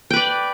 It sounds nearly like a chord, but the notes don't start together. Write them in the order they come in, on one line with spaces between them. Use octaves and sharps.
G5 B4 D5